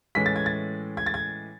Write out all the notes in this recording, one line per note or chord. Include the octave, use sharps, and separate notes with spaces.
A2 E3 G#3 C#4 B6
A6
G#6
A6
G#6
A6
G#6